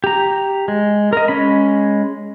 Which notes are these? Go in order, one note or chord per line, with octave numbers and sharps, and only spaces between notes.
G4 A#5
G#3
A#4 D#5
G#3 C#4 B5